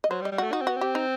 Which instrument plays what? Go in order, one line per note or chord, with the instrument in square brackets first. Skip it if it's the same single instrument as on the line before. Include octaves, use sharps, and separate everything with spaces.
[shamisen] D#5
[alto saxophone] F#3 [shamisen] C5
[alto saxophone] G3
[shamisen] D#5
[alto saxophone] G3
[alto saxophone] A3 [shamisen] F#4
[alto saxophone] D#4 [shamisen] F#4
[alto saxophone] C4
[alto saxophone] B3 [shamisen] F#4
[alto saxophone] C4 [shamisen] G4
[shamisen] D#4